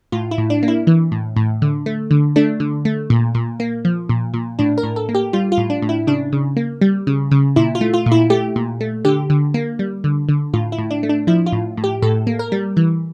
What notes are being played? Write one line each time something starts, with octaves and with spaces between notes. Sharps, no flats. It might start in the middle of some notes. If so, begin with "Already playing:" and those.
A2 F4
E4
A2
D4
A#3
E4
E3
A2
A2
D3
A3
D3
A3 D4
D3
A3
A#2
A#2
A#3
F3
A#2
A#2
A2 D4
A#4
A2
A4
A#3
G4
G3 F4
F4
A2
D4
A2
E4
C#3 D4
C#3
A#3
G3
C#3
C#3
A#2 E4
F4
A3
F4
A#2
E4
A3 G4
A#2
A3
D3 G4
D3
A#3
G3
D3
D3
A2 F4
E4
A2
D4
A3
D4
F3 E4
F4
A2
A2
G4
A2 A4
A#3
A#4
G3
E3